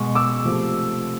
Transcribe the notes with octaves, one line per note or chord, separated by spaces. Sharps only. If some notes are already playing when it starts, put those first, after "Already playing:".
Already playing: B2 G#3 C#6
D6 E6
C3 F3 A3